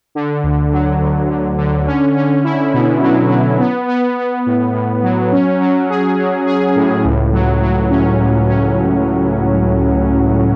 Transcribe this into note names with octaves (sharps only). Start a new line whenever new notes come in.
D3
D2
F#3
D2
D3
D3
C#4
C#4
E4
B2
F#3
F#3
B3
B3
B3
A2
A2
F#3
C#4
F#3
G#4
F#3
G#4
A2
C#2
F#3
F#3
C#4
C#2
C#4